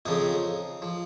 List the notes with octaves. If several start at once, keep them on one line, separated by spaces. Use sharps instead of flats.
F2 C#3 F3 D#4
F3